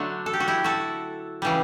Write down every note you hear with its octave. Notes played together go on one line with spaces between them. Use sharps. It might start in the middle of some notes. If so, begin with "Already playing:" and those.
Already playing: D3 F#3 A3 D4 F#4
A4
G4
F#4
E4 G4
F#4 A4
C#3 E3 G3